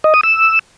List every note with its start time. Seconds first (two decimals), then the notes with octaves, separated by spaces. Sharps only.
0.04 D#5
0.14 D#6
0.23 E6